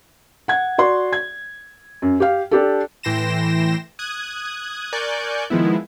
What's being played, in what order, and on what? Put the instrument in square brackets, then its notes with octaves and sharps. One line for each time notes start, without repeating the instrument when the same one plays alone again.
[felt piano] F#5 G#6
F#4 D5 C6
G#6
F#2
G4 F5
D4 G4 A4
[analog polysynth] A2 E3 G5 C6 A#6 E7
D#6 F#6 G#6
A#4 D5 G#5 C#6 F#6 G6
D#3 F3 G#3 B3 E4